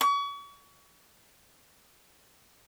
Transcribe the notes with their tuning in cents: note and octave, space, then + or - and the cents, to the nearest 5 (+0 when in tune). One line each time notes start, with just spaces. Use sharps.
C#6 +35